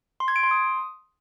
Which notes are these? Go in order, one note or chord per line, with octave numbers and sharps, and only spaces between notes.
C6
G#6
D7
C6
D#6